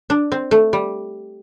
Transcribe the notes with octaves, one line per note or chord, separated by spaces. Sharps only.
D4
C4
A3
G3